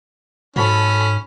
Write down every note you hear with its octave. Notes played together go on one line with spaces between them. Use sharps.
G#2 F#3 C#4 A4 B5